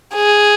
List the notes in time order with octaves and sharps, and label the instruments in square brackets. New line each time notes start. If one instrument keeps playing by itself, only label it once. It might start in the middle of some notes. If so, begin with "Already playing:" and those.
[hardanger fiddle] G#4